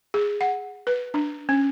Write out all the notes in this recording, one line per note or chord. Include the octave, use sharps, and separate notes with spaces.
G#4
F#5
B4
D4
C#4